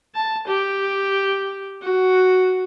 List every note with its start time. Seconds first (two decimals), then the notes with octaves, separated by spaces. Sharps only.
0.15 A5
0.48 G4
1.83 F#4